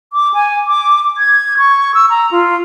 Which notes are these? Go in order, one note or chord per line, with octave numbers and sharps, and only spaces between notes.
D6
G#5
D6
G#6
C#6
E6
A#5
F4